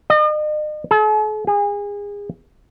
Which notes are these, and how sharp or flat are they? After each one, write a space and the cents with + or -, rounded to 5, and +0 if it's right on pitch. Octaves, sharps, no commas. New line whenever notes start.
D#5 -40
A4 -45
G#4 -30